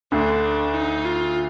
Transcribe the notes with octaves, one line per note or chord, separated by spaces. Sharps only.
D2 D3 D4
D#4
F4